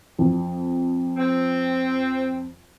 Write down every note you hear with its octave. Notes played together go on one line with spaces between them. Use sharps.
F2
C4